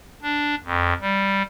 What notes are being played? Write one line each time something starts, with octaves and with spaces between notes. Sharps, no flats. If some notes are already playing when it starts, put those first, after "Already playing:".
D4
F2
G3